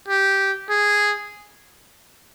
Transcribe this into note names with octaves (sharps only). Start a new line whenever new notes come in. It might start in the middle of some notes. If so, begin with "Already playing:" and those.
G4
G#4